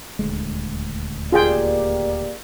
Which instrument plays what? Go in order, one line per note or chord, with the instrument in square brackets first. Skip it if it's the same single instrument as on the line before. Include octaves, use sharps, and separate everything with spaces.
[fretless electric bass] D#1 D2 G#3
[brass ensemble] A#3 G4 D5 [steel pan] F4 G#4 G5